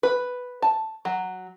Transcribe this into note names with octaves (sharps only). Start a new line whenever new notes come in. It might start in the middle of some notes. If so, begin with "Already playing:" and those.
B4
A5
F#3